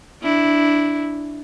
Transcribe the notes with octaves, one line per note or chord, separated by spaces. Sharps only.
D4 E4